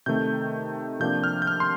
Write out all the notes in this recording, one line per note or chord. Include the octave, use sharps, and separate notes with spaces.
C3 D#3 A3 G6
C3 F3 A#3 D4 G6
F6
G6
F6
C6